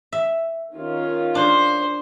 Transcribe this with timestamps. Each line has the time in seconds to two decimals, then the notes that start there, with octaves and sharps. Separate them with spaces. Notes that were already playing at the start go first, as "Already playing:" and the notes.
0.12 E5
0.73 D#3 C#4 F4
1.35 D4 C5